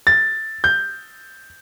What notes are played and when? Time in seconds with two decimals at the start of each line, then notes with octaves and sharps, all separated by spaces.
0.07 A6
0.64 G6